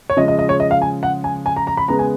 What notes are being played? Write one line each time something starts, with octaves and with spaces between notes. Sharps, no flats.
C#5
C#3 F3 G#3 D#5
D#5
D#5
C#5
D#5
F5
G#5
F#5
G#5
G#5
A#5
A#5
B5
C#3 G#3 B3 A#5
G#5